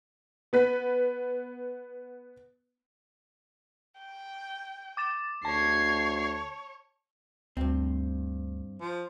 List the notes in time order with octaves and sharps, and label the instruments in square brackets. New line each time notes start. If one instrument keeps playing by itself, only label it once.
[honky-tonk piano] B3 B4 B6
[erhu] G5
[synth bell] D6 A6 E7
[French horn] D2 [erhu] C#5 [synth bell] A5 [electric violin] G#6 C7
[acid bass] D2 [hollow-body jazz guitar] G2 C4
[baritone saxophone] F3